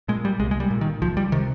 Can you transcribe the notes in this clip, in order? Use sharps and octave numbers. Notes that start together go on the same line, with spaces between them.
A#2 G#3
G3
C2 G#3
G#3
G3
A#2
D#3
C#2 F3
G3
C3 D#3